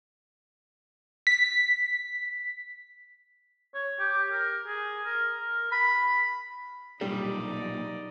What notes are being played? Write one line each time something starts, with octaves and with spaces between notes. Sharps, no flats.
B6
C#5
G4
A#4
G#4
A#4
A#4
B5
B1 A#2 G3 D#4 D5